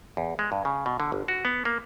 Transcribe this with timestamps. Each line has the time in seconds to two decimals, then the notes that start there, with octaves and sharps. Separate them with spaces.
0.17 E2
0.39 G#3
0.52 G2
0.65 C#3
0.86 B2
1.00 D3
1.12 G1
1.28 F#4
1.45 B3
1.65 A#3